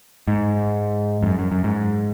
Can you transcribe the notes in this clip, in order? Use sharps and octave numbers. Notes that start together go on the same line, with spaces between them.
G#2
F2
F#2
F#2
F#2
G#2